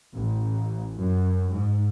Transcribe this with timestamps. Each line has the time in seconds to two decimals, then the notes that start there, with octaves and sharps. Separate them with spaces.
0.14 A1
0.98 F#2
1.51 G#2